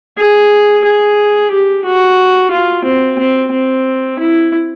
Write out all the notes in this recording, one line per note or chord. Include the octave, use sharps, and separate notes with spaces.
G#4
G#4
G4
F#4
F4
C4
C4
C4
E4